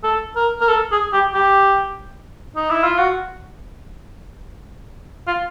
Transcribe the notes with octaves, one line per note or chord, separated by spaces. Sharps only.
A4
A#4
A#4
A4
G#4
G4
G4
D#4
E4
F4
F#4
F4